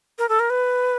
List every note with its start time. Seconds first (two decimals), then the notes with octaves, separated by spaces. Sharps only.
0.19 A#4
0.29 A4
0.40 A#4
0.50 B4